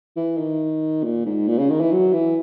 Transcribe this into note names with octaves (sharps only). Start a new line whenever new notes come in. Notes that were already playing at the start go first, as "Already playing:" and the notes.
E3
D#3
A#2
G#2
A#2
C#3
D#3
E3
F#3
E3